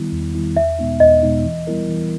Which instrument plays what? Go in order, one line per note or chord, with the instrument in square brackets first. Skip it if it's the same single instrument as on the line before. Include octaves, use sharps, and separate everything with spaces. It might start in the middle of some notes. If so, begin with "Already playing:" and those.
Already playing: [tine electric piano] D#3 G3 B3 E4
E2
D#3 G3 B3 E4
[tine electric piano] E2 [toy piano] E5
[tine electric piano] B2 G#3 B3 D#4
[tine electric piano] E2 [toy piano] D#5
[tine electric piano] B2 G#3 B3 D#4
E3
G3 B3 E4 A#4
E3